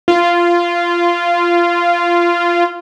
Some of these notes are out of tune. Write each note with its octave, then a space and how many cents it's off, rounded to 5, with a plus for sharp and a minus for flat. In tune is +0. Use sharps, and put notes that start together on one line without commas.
F4 -15